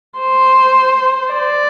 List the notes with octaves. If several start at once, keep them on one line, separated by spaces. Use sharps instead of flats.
C5
D5